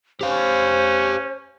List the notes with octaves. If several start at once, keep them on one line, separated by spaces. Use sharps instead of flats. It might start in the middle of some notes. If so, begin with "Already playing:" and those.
C#4 G4 C5 F5